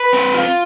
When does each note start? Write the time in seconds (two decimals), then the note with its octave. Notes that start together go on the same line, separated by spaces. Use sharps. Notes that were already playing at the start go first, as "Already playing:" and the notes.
Already playing: B4
0.13 C4
0.34 F4